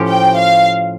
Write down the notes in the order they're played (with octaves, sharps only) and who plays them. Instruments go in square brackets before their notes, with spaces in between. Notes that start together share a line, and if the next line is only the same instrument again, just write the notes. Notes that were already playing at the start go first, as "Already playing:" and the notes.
Already playing: [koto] A2 F3 C#4 G4
[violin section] G5
F5